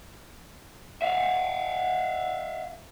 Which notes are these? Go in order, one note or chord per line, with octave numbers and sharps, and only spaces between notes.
E5 F5